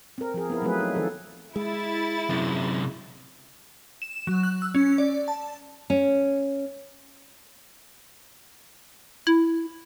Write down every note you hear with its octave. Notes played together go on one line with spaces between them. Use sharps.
C4 A#4
F3 G#4
B3 E4 A#4
F3 F#3 A3 C4 G#4 B4
D#4
D#3 F3 A4
G#3 E4 A6
F#2 C3
E7
F#3
F#6
E6
C#4
D5
A5
C#4
E4